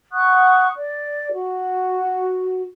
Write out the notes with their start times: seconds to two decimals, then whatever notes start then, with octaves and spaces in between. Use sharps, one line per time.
0.12 F#5 C#6 D#6 F#6
0.76 D5
1.33 F#4